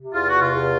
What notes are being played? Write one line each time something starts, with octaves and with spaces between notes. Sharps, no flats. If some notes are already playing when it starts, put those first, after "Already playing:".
Already playing: C3
E2 F4
F#4
C3
F4
E2